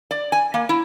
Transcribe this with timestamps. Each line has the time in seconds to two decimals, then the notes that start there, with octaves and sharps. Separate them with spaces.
0.11 D5
0.32 G#5
0.54 A#3
0.69 E4